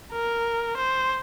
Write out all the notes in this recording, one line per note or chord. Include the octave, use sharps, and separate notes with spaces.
A#4
C5